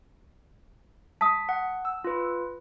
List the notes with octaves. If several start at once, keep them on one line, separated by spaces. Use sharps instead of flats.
A5 D#6 B6
F#5
E6
F4 B4